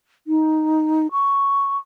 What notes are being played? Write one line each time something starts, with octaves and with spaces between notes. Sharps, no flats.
D#4
C#6